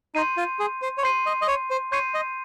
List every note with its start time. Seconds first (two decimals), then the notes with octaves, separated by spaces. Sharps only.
0.15 D#4 C6 G6 C7 D#7
0.37 F4
0.59 G#4
0.82 C5
0.98 C#5
1.03 C5 C6 G6 C7 D#7
1.26 D#5
1.42 D#5
1.48 C#5
1.70 C5
1.92 C#5 C6 G6 C7 D#7
2.14 D#5